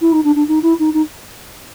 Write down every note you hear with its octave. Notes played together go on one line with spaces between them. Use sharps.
E4
D#4
D4
D4
D#4
E4
D#4
D#4